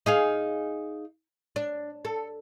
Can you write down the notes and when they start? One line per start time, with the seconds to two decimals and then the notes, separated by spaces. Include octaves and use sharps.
0.06 D#4 G#4 F5
1.56 D4
2.05 A4